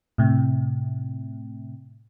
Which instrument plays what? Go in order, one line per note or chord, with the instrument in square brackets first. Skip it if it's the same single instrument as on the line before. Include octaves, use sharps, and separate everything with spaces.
[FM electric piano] A2 C3